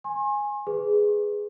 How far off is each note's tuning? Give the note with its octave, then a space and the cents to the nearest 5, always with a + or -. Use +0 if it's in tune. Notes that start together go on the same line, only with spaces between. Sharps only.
G#5 -5 C6 +45
G#4 +0 B4 +10